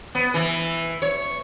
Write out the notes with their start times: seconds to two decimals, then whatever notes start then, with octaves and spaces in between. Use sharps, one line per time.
0.15 B3
0.34 E3
1.02 C#5